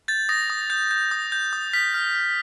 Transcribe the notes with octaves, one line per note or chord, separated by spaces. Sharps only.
G6 A6
D#6 A#6
D#6
G6
G6
D#6
G6
D#6
F6 B6
F6
F6